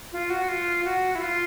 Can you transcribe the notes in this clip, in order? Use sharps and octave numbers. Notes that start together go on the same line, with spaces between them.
F4
F#4
F4
F#4
E4
F4